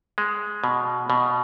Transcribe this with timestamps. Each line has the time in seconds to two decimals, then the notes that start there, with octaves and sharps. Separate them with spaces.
0.18 G#3
0.64 B2
1.10 B2